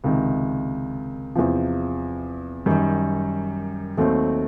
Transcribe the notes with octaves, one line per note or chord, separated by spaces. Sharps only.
C#2 C3 D#3
E2 C3 F3
F#2 D#3 G3
D#2 D#3 F#3 A3 C4